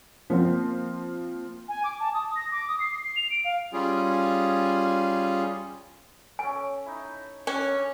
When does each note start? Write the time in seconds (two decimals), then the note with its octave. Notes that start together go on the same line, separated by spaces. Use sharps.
0.30 F3 A#3 C4
1.69 G#5
1.84 D6
2.00 A5
2.14 D#6
2.36 A#6
2.51 D6
2.68 D#6
2.80 C7
3.04 C7
3.16 F7
3.30 D7
3.45 F5
3.73 G3 C#4 F4 G#4
6.39 C#4 A4 G#5
6.86 D#4 E4
7.47 C#4 D4 C#5